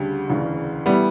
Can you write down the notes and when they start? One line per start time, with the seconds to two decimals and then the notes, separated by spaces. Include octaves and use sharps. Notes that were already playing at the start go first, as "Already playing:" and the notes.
Already playing: D2 C#3 G3 D4 G4
0.28 E1 D2 C#3 E3
0.86 E3 G3 A3 B3 E4